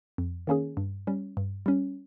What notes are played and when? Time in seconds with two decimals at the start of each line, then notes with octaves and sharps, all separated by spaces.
0.18 F2
0.47 D#3 A#3 C#4 G#4
0.77 G2
1.07 G3 C#4
1.37 G2
1.66 G3 C#4